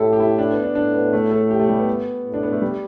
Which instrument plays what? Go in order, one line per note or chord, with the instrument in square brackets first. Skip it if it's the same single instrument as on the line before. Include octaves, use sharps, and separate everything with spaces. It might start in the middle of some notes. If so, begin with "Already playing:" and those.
Already playing: [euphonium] A2 [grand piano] E4 G4 A4
[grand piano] G4
E4
D4
B3
D4
[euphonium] A2 [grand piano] D4
[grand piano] B3
A3
A4
G4
A3
G3
B3
[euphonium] A2
[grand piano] D4
B3
A3
G3